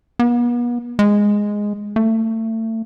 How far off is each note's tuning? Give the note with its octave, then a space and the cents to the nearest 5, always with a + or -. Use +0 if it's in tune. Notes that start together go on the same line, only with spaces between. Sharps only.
B3 -40
G#3 -5
A3 +30